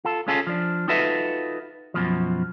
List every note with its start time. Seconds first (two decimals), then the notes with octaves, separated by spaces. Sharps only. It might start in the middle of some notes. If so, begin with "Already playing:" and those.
0.05 F4 A4
0.28 C#4 F4 G#4 A4
0.47 F3 D4
0.88 D#4 F4 F#4 A4 B4 E5
1.94 F#2 B2 F3